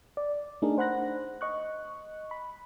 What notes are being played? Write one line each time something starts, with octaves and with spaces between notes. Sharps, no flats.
D5
A3 D4 D#4 G#4 A#4
C5 F#5 B5 F#6 A#6
D#5 C#6 F#6
B5